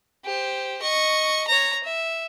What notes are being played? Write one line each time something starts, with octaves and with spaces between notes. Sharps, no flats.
G4 C5
D#5 C#6
C#5 A#5
E5